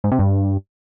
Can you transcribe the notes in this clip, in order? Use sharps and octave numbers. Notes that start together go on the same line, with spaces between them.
G#2
C3
G2